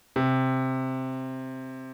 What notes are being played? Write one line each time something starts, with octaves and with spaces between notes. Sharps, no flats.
C3